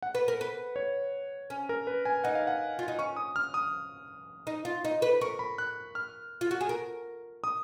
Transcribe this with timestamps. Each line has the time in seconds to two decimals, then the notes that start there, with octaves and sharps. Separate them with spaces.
0.02 F#5
0.15 B4
0.28 A#4
0.41 B4
0.76 C#5
1.50 C#4
1.69 A#4
1.87 B4
2.05 G#5
2.24 D#4 F#5
2.35 F5
2.47 F#5
2.79 F4
2.88 D#4
2.99 C#4 C#6
3.16 D#6
3.36 F6
3.54 D#6
4.47 D#4
4.65 F4
4.85 D#4
5.02 B4
5.21 A#4 C#6
5.39 B5
5.58 F#6
5.95 F6
6.41 F4
6.51 F#4
6.61 G#4
6.69 A#4
7.44 D#6